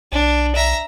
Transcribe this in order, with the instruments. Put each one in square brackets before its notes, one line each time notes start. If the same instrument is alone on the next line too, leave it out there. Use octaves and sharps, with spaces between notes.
[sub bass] B1 [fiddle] D4
[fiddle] E5 A#5